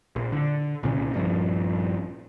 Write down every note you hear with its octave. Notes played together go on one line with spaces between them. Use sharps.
A#1
D3
C2 A#2 C#3
A#1 G2 F3